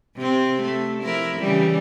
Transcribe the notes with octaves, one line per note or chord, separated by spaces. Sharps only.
C3 C4
A3
F3 E4 A#4
C#3 E3 G3